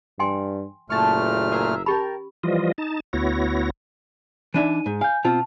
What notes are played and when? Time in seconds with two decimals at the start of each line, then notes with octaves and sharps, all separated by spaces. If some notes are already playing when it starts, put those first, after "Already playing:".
0.19 G2 G5 G#5 C6
0.90 F#1 A#2 A3 A#3 A5 C#6 F6
1.52 G#4 A#4 E5
1.86 C#4 G4 A#4 G5 A5 B5
2.43 E3 F3 G3 F4 D#5
2.78 D#4 A5
3.13 D2 B3 E4 F#4 C#5 A#6
4.54 E3 D4 D#4 E5 D#7
4.86 G#2
5.01 F5 G#5 G6
5.24 B2 C4 F4 A5